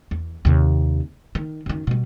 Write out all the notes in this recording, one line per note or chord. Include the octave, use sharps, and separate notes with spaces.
E2
D#2 C3
D#3
F#2 D#3
B2 G3